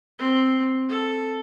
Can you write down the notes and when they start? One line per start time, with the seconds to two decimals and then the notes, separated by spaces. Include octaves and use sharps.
0.19 C4
0.89 A4